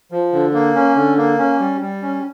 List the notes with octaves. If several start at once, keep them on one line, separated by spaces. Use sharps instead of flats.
F3
D3
A#3
C#4
D3
A#3
C#4
G3
G3
C#4